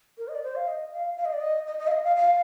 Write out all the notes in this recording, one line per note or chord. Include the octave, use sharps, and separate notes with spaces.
A#4
D#5
D5
C5
F5
D#5
F5
F5
D#5
D5
D#5
D#5
D#5
F5
D#5
F5
F5